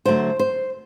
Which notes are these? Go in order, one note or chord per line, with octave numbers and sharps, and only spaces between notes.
D2 D3 F#3 A3 C5
C5